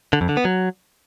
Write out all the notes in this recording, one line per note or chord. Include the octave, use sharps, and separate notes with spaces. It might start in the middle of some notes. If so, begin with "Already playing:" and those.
D3
F2
D3
B3
F#3